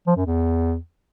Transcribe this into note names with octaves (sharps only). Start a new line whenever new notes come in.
F3
F#2
E2